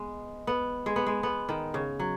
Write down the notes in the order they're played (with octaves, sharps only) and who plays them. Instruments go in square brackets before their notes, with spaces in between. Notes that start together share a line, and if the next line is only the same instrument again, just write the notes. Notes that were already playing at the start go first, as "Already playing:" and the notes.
Already playing: [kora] G#3 B3
B3
G#3
B3
G#3
B3
D#3
C#3
F#3